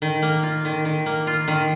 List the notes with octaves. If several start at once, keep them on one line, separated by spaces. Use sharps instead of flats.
D#3
A#3
F4
D#3
D#3
A#3
F4
D#3